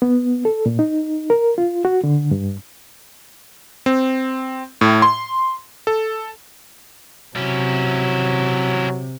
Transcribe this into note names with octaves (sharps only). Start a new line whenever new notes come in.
B3
A4
A#2
D#4
A#4
F4
F#4
D3
G2
C4
A2
C6
A4
C3 F#3 C#4 E4